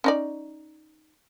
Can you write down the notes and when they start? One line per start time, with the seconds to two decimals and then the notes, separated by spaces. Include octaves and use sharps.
0.04 C#4 D#4 D5